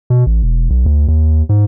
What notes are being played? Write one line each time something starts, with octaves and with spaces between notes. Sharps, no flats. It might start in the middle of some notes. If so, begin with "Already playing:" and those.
B2
A1
E1
B1
D2
D#2
G#2